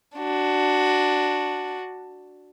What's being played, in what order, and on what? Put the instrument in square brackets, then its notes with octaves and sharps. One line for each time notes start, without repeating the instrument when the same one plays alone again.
[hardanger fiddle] D4 F#4